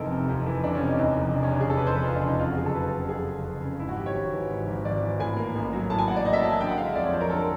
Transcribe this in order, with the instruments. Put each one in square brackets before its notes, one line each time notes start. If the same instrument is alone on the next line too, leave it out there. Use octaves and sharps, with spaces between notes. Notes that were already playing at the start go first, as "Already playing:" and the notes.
Already playing: [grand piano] F1 F2 E3 D#4 A4 A#4
C3
F2
E3
F1 D4
C#4
C3
D#4
E2 D#4
F1
D#4
F1 D4
C#4
C#3 D4
G#4
E2 A4
B4
F1 C5
B4
F1 F4
D4
C#3
D#4
F2 F4
F#4
F#1 G#4
A4
F#1 B4
C#3 A4
F2 G#4
F#1
F#1
C#3
G#2 E4
F#4
G#1 G4
C#5
G#1
E3
G#2
G#1
G#1 D5
E3
A2 G#5
A#3
A1
F#3
A2 A5
G#5
A#3 F#5
D5
A1 D#5
E5
F#3 A5
G#5
D3 G5
F#5
G#3 F5
E5
F2 D5
C#5
F3 C5
A#4
D3 A4
A#4